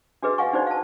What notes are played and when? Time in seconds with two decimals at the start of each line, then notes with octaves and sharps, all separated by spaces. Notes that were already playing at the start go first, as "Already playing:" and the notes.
0.22 D4 F#4 G#4 B4 D#5
0.38 D#5 F5 F#5 G#5 C#6
0.53 D4 D#4 F#4 C5 D5
0.67 F5 A5